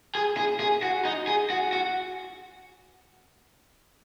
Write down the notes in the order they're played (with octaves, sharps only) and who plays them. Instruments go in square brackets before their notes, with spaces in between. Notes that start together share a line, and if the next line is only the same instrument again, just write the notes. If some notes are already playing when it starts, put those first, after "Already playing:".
[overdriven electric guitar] G#4
G#4
G#4
F#4
D#4
G#4
F#4
F#4